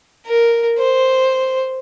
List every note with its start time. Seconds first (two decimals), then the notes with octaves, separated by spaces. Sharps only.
0.27 A#4
0.78 C5